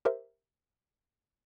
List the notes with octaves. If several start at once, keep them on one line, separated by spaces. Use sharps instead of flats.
G4 A#4 C5 E5